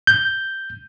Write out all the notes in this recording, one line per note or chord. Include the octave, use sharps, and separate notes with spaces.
G6